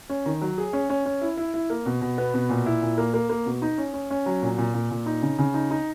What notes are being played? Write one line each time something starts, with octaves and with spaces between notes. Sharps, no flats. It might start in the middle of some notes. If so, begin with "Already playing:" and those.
C#4
D#3
F#3
G#4
C#4
C#4
C#4
E4
E4
E4
A#3
B2
B2
B3
B2
A#2
E4
A#2
A#3
A#3
A#3
B2
D#4
C#4
C#4
C#4
F#3
A#2
A#2
A#2
A#2
D#4
C#3
C#3
D#4
D#4